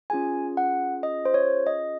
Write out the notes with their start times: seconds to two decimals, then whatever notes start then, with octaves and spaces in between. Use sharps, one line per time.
0.10 C#4 F4 G#4 G#5
0.57 F#5
1.03 D#5
1.25 C5
1.34 C#5
1.67 D#5